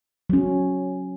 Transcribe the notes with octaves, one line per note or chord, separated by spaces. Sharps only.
F#3 C#4